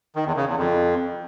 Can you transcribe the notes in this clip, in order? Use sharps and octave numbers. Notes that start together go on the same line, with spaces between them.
D#3
E2
C#3
E2
F2